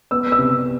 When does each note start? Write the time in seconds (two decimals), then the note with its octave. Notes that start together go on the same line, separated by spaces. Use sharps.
0.11 B3 E6
0.32 E6
0.38 C3